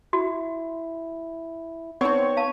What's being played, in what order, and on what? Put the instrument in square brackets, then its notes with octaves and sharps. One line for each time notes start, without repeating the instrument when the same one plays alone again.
[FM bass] E4 [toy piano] F#4
[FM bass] B3 [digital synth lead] C4 [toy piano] D#4 D5 [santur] C#5 C#6
[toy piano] F5 A5